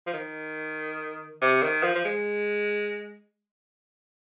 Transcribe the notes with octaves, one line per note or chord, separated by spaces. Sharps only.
F3
D#3
C3
D#3
F3
F3
G#3